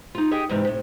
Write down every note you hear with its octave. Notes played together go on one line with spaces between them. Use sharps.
D#4 F4
G4 G#4 D#5 F#5 G5
E2 G#2 C3 E3
A2 C3